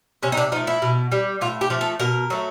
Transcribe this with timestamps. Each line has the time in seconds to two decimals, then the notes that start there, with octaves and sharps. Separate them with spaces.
0.23 C3 C#4
0.32 D#4
0.37 D4
0.52 F3 D#4
0.56 A3
0.67 E4
0.82 B2
1.12 G3
1.41 A2 F4
1.61 G4
1.70 F3 A3
1.81 A4
1.99 B2 A#4
2.30 F#3 A3